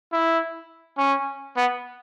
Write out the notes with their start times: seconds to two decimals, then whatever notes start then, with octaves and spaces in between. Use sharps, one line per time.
0.13 E4
0.98 C#4
1.57 B3